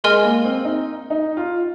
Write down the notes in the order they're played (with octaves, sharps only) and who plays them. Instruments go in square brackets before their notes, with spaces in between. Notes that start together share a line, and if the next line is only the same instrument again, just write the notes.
[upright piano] G#3 [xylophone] A#4 D#5 G#5 C6 F6
[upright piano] A#3
C4
D#4
D#4
F4